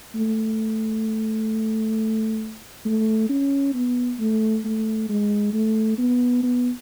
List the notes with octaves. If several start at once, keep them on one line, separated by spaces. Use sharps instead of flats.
A3
A3
C#4
B3
A3
A3
G#3
A3
B3
B3